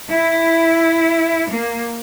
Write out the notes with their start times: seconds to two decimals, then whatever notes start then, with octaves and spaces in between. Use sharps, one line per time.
0.11 E4
1.51 A#3